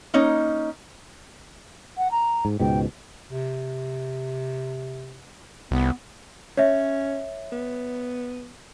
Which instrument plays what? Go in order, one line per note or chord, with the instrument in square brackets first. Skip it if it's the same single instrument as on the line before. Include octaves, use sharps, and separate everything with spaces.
[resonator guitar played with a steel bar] A#3 C#4 D#4 D#5
[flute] F#5
A#5
[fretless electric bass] G#2
[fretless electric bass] C#2 G#2 B2 [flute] G5
[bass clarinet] C3
[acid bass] C2 [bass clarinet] B3
[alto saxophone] C#4 [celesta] C#5 E5
[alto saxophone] B3